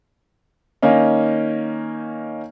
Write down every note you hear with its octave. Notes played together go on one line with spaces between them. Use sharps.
D#3 A#3 C#4 D#4